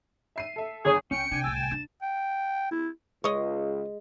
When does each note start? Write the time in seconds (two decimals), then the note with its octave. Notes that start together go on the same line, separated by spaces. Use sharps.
0.36 E5 C7 D#7
0.56 A4 E5
0.85 G1 G#4 C#5
1.11 C#2 C#4 G5 C#7
1.31 C3 D4 G5 G#5
1.44 D1 C2 A5 E6
1.56 E7
1.71 D4
2.02 G5
2.71 E4
3.24 C#2 G#3 C#5 D#5